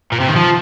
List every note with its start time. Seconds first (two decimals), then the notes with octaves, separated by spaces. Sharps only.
0.12 A#2
0.20 C3
0.28 D#3
0.36 F3